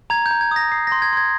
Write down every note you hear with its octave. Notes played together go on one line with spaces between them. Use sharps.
A#5 G#6
G6
A#5
G#6
D#6 A#6
D#6 C7
A#6
C6
G#6
C6 G#6